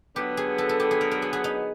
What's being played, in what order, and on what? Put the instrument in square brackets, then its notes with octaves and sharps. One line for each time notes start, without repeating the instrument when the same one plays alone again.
[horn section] D3 F#3 B3 [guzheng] G4
[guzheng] G#4
A4
A4
G4
G#4
A#4
A#4
G#4
G#4
D#4